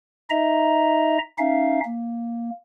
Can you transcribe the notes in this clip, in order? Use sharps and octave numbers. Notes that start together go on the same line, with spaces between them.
D#4 D#5 E5 A#5
C#4 D#4 E5 F5
A#3